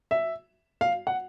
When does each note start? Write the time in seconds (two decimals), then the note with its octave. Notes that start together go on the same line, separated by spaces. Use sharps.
0.11 E5
0.81 F5
1.07 F#5